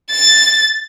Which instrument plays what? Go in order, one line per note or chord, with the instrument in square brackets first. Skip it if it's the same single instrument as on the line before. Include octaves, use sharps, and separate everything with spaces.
[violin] A6